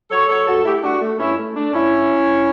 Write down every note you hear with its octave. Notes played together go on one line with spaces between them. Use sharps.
F#3 A4 C#5
F#3 A4 C#5
G2 F#4 A4
A3 E4 G4
G4
A3 D4 F#4
A3
G2 C#4 E4
A3
A3 D4
G2 C#4 E4
G2
F#3
G2